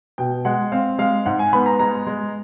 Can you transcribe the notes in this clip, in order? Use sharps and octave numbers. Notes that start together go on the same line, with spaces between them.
B2 G5
G#3 F#5
C4 F5
G#3 F5
G#2 F#5
G#5
B3 B5
A#5
G#3 A#5
G#3